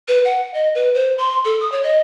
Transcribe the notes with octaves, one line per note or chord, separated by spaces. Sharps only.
B4
F#5
D#5
B4
C5
C6
A4
D#6
C#5
D#5